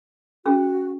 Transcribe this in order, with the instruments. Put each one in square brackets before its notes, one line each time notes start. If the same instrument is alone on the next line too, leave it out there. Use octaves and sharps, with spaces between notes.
[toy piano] C#4 G#4 [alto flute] F#4